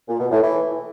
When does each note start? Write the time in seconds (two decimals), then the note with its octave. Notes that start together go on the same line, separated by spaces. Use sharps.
0.08 A#2
0.20 B2
0.31 A2
0.42 E3